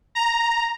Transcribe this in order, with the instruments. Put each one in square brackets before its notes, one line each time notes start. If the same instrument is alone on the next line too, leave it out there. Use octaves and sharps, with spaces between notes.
[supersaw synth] A#5